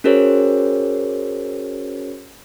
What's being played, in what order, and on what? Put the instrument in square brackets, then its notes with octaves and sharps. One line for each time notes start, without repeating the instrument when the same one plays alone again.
[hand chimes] C#4 F#4 G#4 A#4 C5 C#5